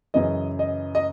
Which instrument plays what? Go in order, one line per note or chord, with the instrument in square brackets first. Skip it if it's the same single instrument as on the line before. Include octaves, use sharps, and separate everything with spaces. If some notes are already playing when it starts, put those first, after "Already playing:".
[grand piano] F#2 C#3 E3 D#5
D#5
D#5